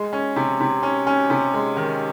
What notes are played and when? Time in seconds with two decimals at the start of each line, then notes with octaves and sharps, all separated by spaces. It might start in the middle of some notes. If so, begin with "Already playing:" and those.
Already playing: G#3
0.13 C#4
0.36 C3
0.60 C3
0.83 C#4
1.07 C#4
1.30 C3
1.54 G#3
1.77 D#3